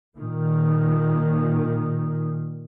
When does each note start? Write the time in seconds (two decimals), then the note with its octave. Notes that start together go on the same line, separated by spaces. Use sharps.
0.16 A#2 D#3